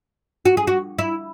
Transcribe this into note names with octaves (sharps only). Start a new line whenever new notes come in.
F#4
G#4
F#4
E4